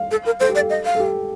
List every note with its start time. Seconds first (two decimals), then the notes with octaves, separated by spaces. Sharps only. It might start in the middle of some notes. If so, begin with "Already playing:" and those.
Already playing: F5
0.11 A4
0.26 A#4
0.40 A4 C5
0.49 G4
0.55 D5
0.58 A4
0.70 D#5
0.85 F5
0.95 A4
1.00 G4